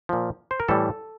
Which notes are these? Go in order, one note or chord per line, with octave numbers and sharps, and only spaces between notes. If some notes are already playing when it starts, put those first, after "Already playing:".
A#2 F3
C5
A#4
A2 E3 G3 A4